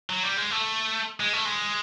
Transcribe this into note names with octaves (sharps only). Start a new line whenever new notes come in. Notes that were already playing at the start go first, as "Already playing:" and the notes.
F#3
G3
G#3
A3
G#3
A3
G#3